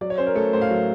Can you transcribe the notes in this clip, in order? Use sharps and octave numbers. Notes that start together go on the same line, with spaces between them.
F#3 D5
C#5
C#4 C5
A#4
A3 A4
A2 C5
F5
F#3